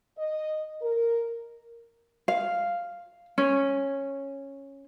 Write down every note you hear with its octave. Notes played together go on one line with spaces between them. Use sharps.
D#5
A#4
F5
C#4